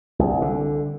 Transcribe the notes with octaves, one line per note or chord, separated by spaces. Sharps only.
C2
D3